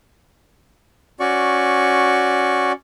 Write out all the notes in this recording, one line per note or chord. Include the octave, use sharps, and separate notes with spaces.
C#4 F#4 D5 C#6